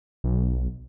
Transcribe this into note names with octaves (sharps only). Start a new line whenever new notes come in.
B1